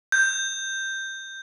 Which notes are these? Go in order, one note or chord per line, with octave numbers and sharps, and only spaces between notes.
G6